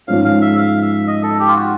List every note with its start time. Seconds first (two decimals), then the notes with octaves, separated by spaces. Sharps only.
0.08 G#2 F3 G#3 C#4 F5
0.25 F5
0.41 E5
0.58 F5
0.82 E5
1.07 D#5
1.23 A4
1.40 G4
1.48 F4
1.56 F#4